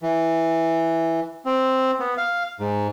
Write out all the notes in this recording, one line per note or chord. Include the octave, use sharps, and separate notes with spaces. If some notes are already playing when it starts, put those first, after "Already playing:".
E3
C4
B3
F5
G#2